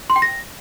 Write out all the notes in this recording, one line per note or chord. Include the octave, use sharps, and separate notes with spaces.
C6
G5
A#6